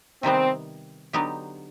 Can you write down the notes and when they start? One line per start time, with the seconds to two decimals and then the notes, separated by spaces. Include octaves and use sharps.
0.23 C3 D#3 G3 B3 C4
1.13 D3 F#3 B3 D#4 G4